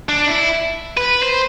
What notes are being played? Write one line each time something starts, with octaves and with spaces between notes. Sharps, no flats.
D4
E4
B4
C5